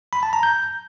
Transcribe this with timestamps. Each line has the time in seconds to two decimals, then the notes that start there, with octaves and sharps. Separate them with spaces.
0.13 B5
0.23 A5
0.33 A#5
0.43 G6